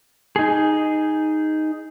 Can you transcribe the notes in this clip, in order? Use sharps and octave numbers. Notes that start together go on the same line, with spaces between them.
D#4 G#4